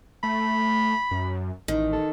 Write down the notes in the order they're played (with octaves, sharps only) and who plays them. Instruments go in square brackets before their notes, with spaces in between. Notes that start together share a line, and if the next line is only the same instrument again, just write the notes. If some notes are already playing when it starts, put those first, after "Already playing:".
[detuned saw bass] A3 [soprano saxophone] B5
[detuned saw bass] F#2
[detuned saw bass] A1 [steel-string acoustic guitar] D#3
[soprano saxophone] A4